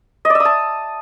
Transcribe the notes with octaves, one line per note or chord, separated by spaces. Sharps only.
D#5
D5
E5
D#6
A5